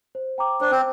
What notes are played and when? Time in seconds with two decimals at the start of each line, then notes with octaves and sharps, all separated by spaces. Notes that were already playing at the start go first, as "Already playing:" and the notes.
0.15 C5
0.38 G5 A#5 D6
0.61 D4 C5
0.71 C4